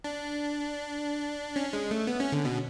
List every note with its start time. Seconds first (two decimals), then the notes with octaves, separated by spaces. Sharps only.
0.04 D4
1.56 C#4
1.73 G#3
1.91 A3
2.07 B3
2.20 C#4
2.32 D3
2.45 B2